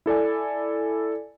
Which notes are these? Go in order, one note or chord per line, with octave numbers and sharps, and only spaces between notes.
E4 A4 D5 G#5